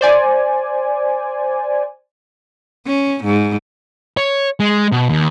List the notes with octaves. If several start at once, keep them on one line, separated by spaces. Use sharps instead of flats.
C5 D5 G#5
C#4
G#2
C#5
G#3
B2
D#2